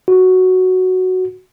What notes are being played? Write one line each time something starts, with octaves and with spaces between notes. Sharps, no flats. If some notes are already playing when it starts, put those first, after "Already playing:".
F#4